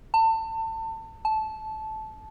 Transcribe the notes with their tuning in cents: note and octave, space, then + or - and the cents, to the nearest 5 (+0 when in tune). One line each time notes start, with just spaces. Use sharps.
A5 +30
A5 -15